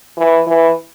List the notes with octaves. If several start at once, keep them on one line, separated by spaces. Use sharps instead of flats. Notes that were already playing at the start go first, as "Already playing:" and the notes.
E3
E3